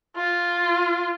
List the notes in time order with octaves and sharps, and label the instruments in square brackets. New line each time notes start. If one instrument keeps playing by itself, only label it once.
[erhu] F4